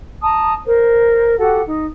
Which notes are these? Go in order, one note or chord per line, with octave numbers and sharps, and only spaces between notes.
A5 A#5 D#6
A#4 C5
F#4 G4 A4 F#5
D#4